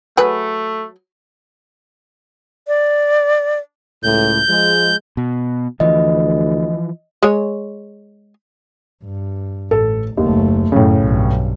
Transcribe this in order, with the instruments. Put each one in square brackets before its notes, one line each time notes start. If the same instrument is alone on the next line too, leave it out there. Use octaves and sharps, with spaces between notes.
[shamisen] F#3 G#4 B4 [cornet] A3
[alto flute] D5
[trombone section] C#2 A2 [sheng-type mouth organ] G6
[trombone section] F3 G#3
[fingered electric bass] B2
[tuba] D2 [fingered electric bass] E3 F3 [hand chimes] D#5
[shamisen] G#3 C#5
[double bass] G2
[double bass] A1 [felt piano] A4
[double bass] F#1 A3 [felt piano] D#2
[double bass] F#2 [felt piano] A2 C#3
[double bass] B1 G2